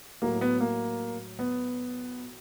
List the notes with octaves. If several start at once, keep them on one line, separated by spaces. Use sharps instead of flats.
A2 F#3 A#3
B3
A#3
B3